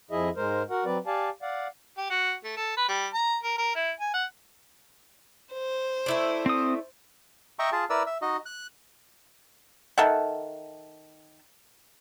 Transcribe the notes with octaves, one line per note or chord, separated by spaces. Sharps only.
F2 F3 E4 G#4 D#5 E5
G#2 G#3 A#4 C5
F#4 A#4 F#5
F#3 C4 B4 D5
G4 D5 F5 G#5 A5
D5 F5 F#5
G4
F#4
A3
A4
B4
G3
A#5
A#4
A#4
E4
G#5
F#5
C5
A3 E4 D5
C4 D#6
D#5 E5 G5 A#5 C#6
F4 G#4 A5
E4 A#4 B4 D5 E6
E5
D#4 F#4 D#5
F#6
D#3 A4 E5 F#5